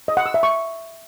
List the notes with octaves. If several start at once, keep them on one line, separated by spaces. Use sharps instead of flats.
D#5
F#5
E6
E5
C#6